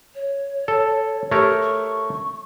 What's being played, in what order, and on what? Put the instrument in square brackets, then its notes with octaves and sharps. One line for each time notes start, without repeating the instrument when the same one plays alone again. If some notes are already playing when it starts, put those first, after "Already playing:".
[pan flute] C#5
[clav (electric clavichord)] A4
[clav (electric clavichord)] A3 A#4 C#5 [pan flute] G4
[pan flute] C#6